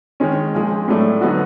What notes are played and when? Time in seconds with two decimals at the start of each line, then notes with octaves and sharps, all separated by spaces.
0.20 D#3 G#3 C#4
0.54 A#2 F3 G#3
0.88 A2 F#3 A3 D4
1.21 D3 F#3 B3 D#4 F#4